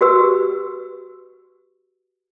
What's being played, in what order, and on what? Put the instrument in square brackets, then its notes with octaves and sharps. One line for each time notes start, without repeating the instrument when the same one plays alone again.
[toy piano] F#4 G4 B4 E6